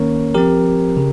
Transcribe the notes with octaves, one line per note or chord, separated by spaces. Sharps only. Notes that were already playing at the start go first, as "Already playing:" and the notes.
Already playing: D#3 A#3 C#4 A#4 C#5
F3 C4 G4 A#4
C#3